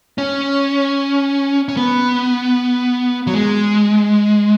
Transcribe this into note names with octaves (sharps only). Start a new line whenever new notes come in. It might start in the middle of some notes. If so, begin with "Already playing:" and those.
C#4
C#4
B3
F#3
G#3